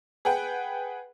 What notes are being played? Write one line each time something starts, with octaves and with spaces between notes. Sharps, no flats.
G#4 B4 F#5 G5